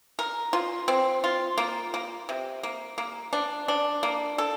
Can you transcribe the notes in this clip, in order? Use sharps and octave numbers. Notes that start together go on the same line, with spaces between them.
A#4
F4
C4
F4
A#3
A#3
C3
A#3
A#3
D4
D4
A#3
A4